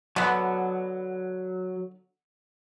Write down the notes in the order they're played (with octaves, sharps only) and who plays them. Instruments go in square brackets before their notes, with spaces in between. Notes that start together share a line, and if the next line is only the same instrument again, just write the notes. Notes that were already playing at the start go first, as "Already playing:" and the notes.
[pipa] D3 B3 [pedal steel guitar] F#3